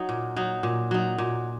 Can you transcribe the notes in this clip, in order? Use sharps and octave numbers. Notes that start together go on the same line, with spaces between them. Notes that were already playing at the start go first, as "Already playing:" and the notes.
Already playing: F#3 D#4
A#2
F#3 D#4
A#2
F#3 D#4
A#2